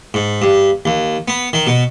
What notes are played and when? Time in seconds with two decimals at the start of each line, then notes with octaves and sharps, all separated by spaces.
0.14 G#2
0.42 G2
0.85 D#2
1.28 B3
1.53 D#3
1.67 B2